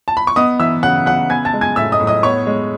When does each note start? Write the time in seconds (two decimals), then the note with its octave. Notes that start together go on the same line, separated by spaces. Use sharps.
0.08 A5
0.17 B5
0.27 C#6
0.36 B3 D#5 D#6
0.60 E3 E5 E6
0.83 C#3 F#5 F#6
1.06 C#3 F#5 F#6
1.30 B3 G#5 G#6
1.45 A5 A6
1.54 G#3
1.61 G#5 G#6
1.76 A2 E5 E6
1.92 D#5 D#6
2.00 A2
2.07 D#5 D#6
2.23 B3 C#5 C#6
2.47 G#3